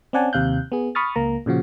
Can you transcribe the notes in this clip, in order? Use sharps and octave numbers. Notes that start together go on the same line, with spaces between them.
C4 C#4 D5 F#5 G#5 A5
D#2 C3 F5 F#6 G6
B3 G#4
B5 C#6 D#6 F6 A6
C#2 A#3 A#5
A#2 C#3 F3 F#4